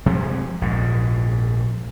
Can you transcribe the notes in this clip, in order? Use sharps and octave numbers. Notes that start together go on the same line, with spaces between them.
C3 F3 G#3
A#1 G#2